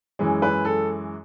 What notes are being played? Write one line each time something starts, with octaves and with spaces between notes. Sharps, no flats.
F#2 E3 G#3
B4
A4